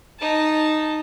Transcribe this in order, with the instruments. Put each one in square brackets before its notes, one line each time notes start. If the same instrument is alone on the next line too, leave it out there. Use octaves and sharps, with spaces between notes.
[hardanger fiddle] D#4 A5